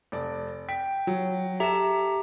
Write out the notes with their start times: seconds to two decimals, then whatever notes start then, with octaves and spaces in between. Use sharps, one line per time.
0.12 F1 D5
0.69 G5 B6
1.07 F#3
1.60 G4 A4 E5 A#5 E7